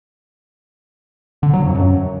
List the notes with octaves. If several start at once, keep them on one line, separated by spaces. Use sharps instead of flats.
D3
F#3
F2
F#2